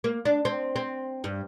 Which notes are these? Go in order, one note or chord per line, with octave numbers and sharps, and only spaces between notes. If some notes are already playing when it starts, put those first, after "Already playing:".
A#3
D4
C4
C4
G2